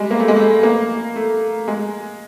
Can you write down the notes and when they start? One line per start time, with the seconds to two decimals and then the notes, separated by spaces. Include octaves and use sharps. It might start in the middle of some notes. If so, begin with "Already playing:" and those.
Already playing: G3 G#3
0.11 A#3
0.20 A3
0.28 G#3
0.36 A3
0.63 A#3
1.16 A3
1.68 G#3